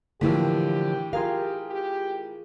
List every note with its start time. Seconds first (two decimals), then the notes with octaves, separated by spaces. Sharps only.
0.21 A2 D3 E3 F3 A#3 G4 E6 B6
1.13 F4 G4 G#4 A#4 F5
1.70 G4